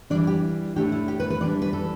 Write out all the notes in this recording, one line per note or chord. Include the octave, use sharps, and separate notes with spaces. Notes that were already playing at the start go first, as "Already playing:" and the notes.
E3 G3 D4 D5
G4
A2 A3 D4 G4
E4
G4
B4
B4
E3 G3 D4 D5
B4
A4